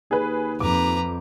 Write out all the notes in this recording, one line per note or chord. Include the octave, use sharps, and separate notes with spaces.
D#2 G#4 B4
F2 B4 A#5 D6